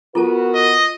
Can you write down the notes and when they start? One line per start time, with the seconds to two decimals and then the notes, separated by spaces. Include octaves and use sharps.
0.15 B3 F4 F#4 A4 A#4 A5
0.55 D#5